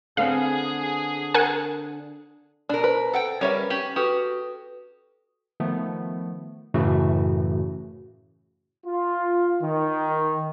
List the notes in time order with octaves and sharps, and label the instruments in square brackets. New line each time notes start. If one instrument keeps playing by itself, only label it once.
[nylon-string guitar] D3 B3 C4 [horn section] G#4 [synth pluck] F5
[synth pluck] A#4 F#5 G#5
[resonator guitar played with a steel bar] B2 A#4 [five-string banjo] D4
[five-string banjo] B4 [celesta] C5
[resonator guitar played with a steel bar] A4 F#5 G5
[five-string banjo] G3 C#5 E5 [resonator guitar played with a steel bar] C#4 A#4 B4
[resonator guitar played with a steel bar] C#4 [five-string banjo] G4 [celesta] F#7
[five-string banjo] F#4 G4 [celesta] A4 B4 D#6
[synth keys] D#3 F3 A3 B3
F#2 A2 C#3 E3 A3 F#4
[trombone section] F4
D#3